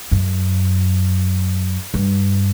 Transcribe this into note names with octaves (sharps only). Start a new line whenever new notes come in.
F#2
G2